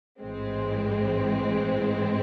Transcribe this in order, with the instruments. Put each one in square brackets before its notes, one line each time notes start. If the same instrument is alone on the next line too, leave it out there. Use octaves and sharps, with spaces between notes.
[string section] A1 G#2 E3 G#3 C4